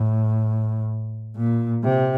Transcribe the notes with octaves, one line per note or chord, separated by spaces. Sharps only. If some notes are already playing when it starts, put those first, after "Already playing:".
Already playing: A2
A#2
C3